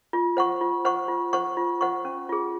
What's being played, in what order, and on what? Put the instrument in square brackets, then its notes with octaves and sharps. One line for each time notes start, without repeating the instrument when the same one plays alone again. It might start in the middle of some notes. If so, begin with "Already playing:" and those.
[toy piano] F4
C5 F#5 C#6
F4
C5 F#5 C#6
F4
C5 F#5 C#6
F4
C5 F#5 C#6
C#4
F4 G#4